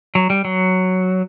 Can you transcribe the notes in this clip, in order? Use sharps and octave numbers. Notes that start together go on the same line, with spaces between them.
F#3
G3
F#3